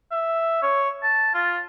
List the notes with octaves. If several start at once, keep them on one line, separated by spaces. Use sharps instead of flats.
E5
C#5
A5
F4